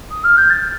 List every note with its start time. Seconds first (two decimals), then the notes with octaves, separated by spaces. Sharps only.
0.11 D#6
0.24 F6
0.37 G6
0.50 A6